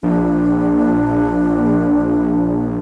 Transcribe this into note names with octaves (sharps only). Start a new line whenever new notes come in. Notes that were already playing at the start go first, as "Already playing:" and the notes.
A#1 D4